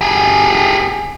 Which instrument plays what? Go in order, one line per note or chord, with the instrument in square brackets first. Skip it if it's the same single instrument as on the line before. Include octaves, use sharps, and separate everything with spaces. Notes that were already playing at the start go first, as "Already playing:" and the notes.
[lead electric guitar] G4 G#4